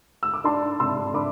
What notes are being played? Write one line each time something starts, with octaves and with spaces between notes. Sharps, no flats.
E6
D6
D4 A5 C6
C3 C6 E6
D4 B5 D6